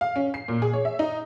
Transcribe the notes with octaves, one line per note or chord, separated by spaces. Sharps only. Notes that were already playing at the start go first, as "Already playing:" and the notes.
F5
C#4
C7
A#2
G#4
C#5
E5
D#4